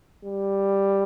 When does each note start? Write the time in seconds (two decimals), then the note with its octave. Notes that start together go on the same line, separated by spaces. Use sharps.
0.24 G3